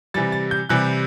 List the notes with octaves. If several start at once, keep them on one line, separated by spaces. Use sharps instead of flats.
C3 E3 G3 A6
A6
G6
C3 E3 G3 F#6